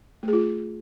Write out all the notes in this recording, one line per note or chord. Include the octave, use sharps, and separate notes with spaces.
A3
G#4
F4